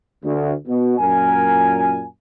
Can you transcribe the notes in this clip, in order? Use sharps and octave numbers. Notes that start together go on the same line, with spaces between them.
D2
B2
F#2 A#2 A#4 G#5